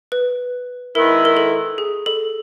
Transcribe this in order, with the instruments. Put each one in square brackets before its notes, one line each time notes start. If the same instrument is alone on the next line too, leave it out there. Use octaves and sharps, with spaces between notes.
[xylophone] B4
[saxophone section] D#3 G#3 B3 E4 [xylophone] A#4
[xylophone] A#4
A4
G#4
A4